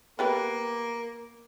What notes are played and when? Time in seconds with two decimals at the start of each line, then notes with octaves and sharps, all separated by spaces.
0.19 A#3 B3 G4 B4